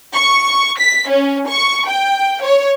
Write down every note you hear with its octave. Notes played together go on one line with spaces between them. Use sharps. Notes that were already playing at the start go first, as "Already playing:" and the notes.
C#6
B6
C#4
C#6
G5
C#5